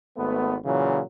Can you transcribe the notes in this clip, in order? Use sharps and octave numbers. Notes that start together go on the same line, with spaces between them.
G#1 A3 B3
A#2 C#3 E3 F#3